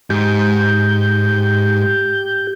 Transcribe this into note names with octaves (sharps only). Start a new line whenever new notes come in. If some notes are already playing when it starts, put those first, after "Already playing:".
G#2 G4 G6